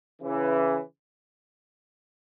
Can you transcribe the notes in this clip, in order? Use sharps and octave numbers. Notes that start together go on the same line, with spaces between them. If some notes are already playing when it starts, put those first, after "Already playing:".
C#3 E3